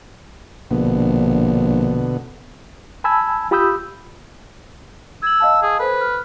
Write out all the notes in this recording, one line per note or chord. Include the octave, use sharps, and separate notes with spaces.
A#1 B2 D3 B3
G#5 A5 B5 E6 G#6
F4 G4 B5 D#6 E6 G6
E6 G#6 F#7
D#5 F5 A5
G#4
A4 B4 C5
F6